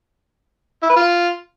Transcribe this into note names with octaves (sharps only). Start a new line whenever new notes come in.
E4
B4
F4